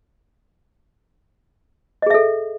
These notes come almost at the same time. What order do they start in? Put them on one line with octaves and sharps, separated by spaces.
D#5 G#4 E5 A4